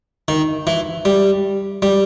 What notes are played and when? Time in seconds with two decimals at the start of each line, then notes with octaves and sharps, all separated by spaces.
0.28 D#3
0.67 E3
1.05 G3
1.82 G3